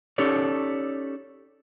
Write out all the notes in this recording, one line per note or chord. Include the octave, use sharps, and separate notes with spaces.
C#4 D#4 G4 A4 C#5 D5